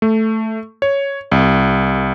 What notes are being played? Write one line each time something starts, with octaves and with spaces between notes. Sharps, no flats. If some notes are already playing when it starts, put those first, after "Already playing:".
A3
C#5
C2